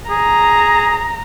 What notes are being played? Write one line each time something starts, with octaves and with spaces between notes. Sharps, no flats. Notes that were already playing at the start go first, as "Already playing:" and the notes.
G#4 A#5